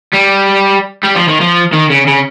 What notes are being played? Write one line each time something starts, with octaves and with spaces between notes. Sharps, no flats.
G3
G3
F3
D#3
F3
D#3
C#3
C#3